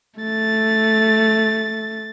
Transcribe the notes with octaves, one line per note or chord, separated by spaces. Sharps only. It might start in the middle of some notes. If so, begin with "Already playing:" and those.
A3 A6